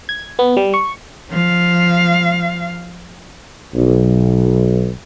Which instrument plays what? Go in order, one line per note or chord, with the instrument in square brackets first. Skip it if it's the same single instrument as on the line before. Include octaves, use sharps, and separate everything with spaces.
[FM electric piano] G#6
B3
G3
C#6
[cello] F3 F5
[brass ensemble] B1